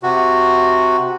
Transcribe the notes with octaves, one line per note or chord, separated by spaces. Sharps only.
C3 F#4